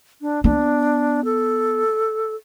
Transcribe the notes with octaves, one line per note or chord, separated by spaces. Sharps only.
D4
B3 D4
A4